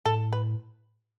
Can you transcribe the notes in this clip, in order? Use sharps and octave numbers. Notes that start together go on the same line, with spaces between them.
A2 A4
B4